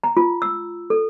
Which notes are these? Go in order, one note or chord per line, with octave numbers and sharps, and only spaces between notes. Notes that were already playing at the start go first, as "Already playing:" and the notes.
A#5
F4
E6
A4